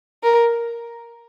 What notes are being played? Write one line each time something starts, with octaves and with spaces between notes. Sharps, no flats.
A#4